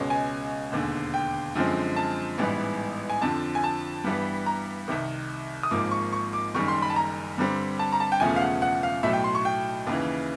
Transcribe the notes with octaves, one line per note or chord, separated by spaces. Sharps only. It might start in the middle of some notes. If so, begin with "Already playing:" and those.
Already playing: C#2 B2 G#3 C#4
G#5
E1 D#2 D3
G5
F#2 D3 F3 G#3 C4
A5
A1 G#2 E3 G3 B3
G#5
F2 D3 F3 A5
G#5
A5
G2 E3 G3 B3
A#5
C2 C3 D#3
D#6
G#1 G#2 F3 A#3 D6
C#6
C#6
D6
F#1 F#2 D#3 G3 C#6
C6
B5
A5
A#5
G2 D3 G3 C4
A5
A#5
A5
G5
E1 E2 C#3 F3 A3 G#5
F5
F#5
F#5
F5
B1 A2 F#3 A3 E5
G5
C6
C#6
G5
D#2 C#3 E3